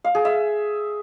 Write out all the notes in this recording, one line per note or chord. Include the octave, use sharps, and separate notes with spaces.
F5
G#4
E5